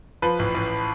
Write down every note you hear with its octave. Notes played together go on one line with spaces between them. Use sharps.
F3 B4
A1
A1